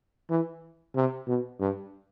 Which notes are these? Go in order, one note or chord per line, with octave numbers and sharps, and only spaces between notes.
E3
C3
B2
G2